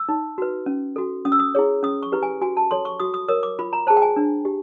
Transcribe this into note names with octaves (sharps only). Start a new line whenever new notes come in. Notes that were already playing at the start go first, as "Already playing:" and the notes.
Already playing: E6
D#4
F#4 B4
C#4
F#4 A4
C#4 D#6
E6
D#6
E4 G#4 C#5
C#4 D#6
C#6
E4 G4 B4
G#5
F#4 G#5
A5
A4 C#5 C6
C#6
F#4 D#6
D#6
A#4 C#5 D#6
D6
F4 B5
A#5
G#4 C5 A5
G5
G#5
D4
G4